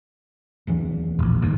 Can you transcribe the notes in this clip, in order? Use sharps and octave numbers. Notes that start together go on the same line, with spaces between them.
D1 E2 E3
E1 A#1
G1 D#2